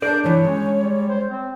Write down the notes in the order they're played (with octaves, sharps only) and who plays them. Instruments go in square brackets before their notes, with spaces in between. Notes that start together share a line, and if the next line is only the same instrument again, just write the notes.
[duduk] D4 [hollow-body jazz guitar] G#4 A#4 D5 [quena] G6
[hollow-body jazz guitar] G2 E3 [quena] C#5
[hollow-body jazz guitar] G#3 [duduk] C#4
[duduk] G3
C5
C4